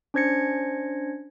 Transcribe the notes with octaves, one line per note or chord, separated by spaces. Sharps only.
C#4 D4 C5 G#6 A#6 C#7